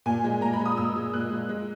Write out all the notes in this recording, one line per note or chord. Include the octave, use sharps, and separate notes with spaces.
A#2 G#5
G#3
A#2 A#5
B5
G#3
D#6
A#2 E6
G#3
A#2 F#6
G#3
G#3